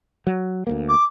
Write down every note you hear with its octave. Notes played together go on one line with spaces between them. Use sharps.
F#3
D2 A3 A#3
D6